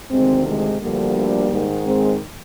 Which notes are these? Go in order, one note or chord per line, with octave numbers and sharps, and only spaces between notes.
D2 C3 D#3 G#3 C4
G#3
D2 D3 F3 G3 A#3
G#2 D#3
G#3 C4